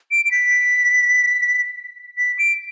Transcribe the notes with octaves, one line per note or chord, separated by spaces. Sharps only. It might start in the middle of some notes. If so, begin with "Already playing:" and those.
D7
D7
B6
B6
D7